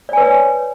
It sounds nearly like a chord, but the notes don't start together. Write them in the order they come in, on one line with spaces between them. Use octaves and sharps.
D5 G#5 B4 C#5